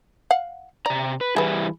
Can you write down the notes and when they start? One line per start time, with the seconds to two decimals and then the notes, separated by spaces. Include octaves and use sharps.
0.31 F5 F#5
0.86 C3 D5 A#5
1.21 B4
1.36 E3 G3 E4 G#4 B4